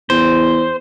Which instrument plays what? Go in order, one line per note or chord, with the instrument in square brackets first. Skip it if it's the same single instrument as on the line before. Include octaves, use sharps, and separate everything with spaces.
[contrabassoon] E2 [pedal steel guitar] C5